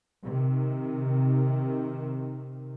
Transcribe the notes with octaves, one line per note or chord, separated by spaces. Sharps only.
C3 D#3